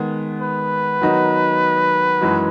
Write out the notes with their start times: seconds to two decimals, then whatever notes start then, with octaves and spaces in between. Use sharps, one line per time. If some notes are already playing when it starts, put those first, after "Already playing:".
Already playing: D#3 G#3 B3
0.41 B4
1.01 D#3 F#3 B3 D#4 F#4
2.21 F#2 E3 G#3 D#4 F#4